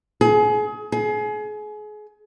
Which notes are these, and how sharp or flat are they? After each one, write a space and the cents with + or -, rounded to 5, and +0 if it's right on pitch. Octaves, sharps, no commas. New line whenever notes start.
G#4 +30
G#4 +30